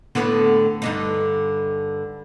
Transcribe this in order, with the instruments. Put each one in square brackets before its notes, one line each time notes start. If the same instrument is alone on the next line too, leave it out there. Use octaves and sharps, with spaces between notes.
[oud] A2 D3 B3
G2 D3 D#4